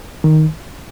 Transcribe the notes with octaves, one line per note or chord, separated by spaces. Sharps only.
D#3